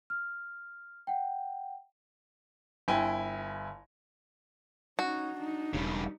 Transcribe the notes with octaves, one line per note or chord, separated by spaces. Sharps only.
F6
F#5 G5
G1 E4 G5 G#5
C#4 D#4 F#4
D4 D#4
E1 C#3 G3